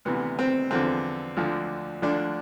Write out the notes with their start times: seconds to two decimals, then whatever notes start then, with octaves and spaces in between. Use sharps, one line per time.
0.05 D2 C3 E3 B3
0.39 C4
0.71 E2 D3 F3 C4
1.37 D2 D3 F3
2.02 D2 D3 F3 D4